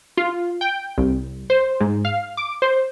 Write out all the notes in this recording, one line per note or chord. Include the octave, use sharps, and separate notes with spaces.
F4
G5
C2
C5
G#2
F5
D6
C5